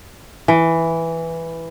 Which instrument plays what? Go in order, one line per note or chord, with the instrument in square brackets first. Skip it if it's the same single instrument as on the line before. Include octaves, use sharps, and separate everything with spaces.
[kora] E3